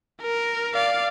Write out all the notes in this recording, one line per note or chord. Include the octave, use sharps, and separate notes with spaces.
A#4
D5 F5